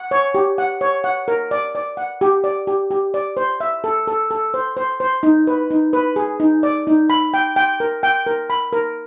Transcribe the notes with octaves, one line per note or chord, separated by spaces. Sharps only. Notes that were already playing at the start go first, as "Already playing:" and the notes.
Already playing: F#5
C#5
G4
F#5
C#5
F#5
A#4
D5
D5
F#5
G4
D5
G4
G4
D5
C5
E5
A4
A4
A4
C5
C5
C5
D#4
B4
D#4
B4
G#4
D#4
D5
D#4
B5
G5
G5
A#4
G5
A#4
B5
A#4